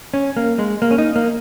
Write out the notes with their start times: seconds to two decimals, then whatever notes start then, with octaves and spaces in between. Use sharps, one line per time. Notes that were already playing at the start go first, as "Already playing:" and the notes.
0.14 C#4
0.37 A#3
0.59 G#3
0.82 A#3
0.91 C#4
0.98 D#4
1.16 A#3